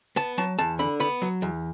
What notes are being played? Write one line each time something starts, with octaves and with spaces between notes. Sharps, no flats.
B3 A5
F#3 A5
E2 A5
D3 B5
B3 B5
F#3
E2